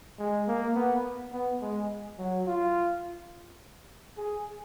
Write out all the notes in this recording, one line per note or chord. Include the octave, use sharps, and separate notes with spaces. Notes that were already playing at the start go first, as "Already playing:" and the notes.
G#3
A#3
B3
B3
G#3
F#3
F4
G#4